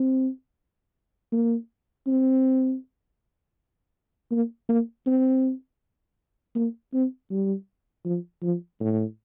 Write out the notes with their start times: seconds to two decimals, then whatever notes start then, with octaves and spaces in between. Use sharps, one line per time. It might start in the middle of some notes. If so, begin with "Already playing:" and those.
Already playing: C4
1.32 A#3
2.07 C4
4.31 A#3
4.69 A#3
5.06 C4
6.55 A#3
6.93 C4
7.31 G3
8.05 F3
8.43 F3
8.80 A2